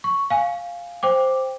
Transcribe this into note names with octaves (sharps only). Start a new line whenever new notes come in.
C#6
F5 G#5
C5 G5 D6